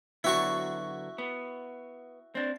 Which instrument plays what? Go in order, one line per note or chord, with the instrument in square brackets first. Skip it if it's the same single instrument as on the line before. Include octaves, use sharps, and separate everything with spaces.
[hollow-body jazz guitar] D3 F#3 B3 [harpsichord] E4 F#4 C#6
[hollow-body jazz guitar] B3
C4 D4